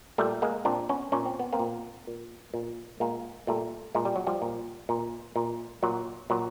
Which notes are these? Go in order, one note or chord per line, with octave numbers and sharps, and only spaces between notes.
A#2 G3 A3
G#3 A#3
A#2 C4 D4
B3 C#4
A#2 C#4
C4
B3
A#3 C4
A#2
A#2
A#2
A#2 G#3 A#3
A#2 G3 A3
A#2 G#3
G3
F#3
F3 G3
A#2
A#2
A#2
A#2 F#3
A#2 F#3